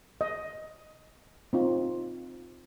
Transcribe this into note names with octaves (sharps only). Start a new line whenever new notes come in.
D#5
C4 D#4 F4